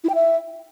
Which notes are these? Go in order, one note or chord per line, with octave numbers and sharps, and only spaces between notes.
E4
G5
E5